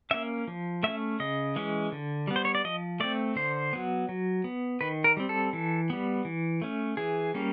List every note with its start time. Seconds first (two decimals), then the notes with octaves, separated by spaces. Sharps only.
0.11 A#3 C#4 E5
0.47 F3
0.83 A3 C#4 E5
1.20 C#3 D#5
1.56 E3 G#3 C#4
1.92 D3
2.27 G3 B3
2.36 C5
2.45 C#5
2.55 D5
2.65 F3 D#5
3.00 A3 C4 D5
3.36 D3 C5
3.73 F#3 B3
4.09 F#3
4.44 B3
4.81 D#3 B4
5.04 A#4
5.17 G3 C4
5.29 A4
5.53 E3
5.90 G3 B3
6.25 E3
6.62 A3 C#4
6.97 E3 G#4
7.34 G3 A#3 C#4